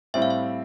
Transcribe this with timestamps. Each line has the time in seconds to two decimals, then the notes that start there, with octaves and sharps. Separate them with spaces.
0.14 A2 G3 C4 E4 E5
0.22 F5
0.30 E5